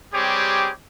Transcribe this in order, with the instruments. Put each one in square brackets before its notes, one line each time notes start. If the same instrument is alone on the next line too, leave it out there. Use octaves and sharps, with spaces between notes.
[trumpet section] G3 C4 G4 G#4 C#5 D6